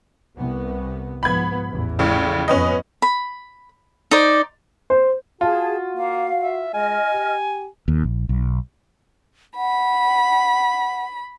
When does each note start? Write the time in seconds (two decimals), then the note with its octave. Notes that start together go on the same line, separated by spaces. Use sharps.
0.38 C2 B3
1.23 G#2 F3 B3 B5 G#6
1.68 A1 E2
1.99 A#1 A2 C#3
2.48 F2 B3 C#4 B4 D#5
3.02 B5
4.11 D#4 C5 D5
4.90 C5
5.41 F4 F#4 G#4 A5
5.97 A#3 F5
6.43 E5
6.74 G#3 D#5 G#5 F6
7.13 G4
7.88 D#2
8.04 A#1
8.29 B1
9.57 F#5 B5